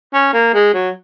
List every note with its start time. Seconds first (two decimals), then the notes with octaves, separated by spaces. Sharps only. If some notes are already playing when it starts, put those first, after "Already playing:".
0.14 C#4
0.33 A#3
0.54 G#3
0.74 F#3